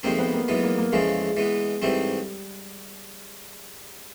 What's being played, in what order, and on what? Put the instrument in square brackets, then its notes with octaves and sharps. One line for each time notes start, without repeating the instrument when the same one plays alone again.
[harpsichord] F2 C3 D#3 G#3 C4 [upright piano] A#3
[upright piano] B3
A#3
[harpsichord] B1 A2 E3 G#3
[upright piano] A#3
A#3
[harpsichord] E2 C#3 F3 A3 [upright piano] G#3
[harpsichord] E3 G#3 B3
[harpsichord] G#2 E3 A3 C4 [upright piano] G3